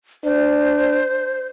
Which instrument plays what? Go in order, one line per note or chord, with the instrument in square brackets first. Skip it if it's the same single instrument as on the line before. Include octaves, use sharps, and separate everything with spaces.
[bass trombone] D4 [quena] C5